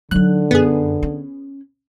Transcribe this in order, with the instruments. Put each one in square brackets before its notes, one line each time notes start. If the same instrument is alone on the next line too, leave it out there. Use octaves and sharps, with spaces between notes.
[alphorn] D3 [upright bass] F#3 D#4 [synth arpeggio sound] F#6
[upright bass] F#2 [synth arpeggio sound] B3 G#4
[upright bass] C#4